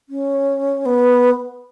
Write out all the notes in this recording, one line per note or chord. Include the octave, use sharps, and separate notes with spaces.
C#4
B3